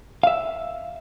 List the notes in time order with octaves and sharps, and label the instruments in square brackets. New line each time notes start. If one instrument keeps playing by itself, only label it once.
[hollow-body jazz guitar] E5 F5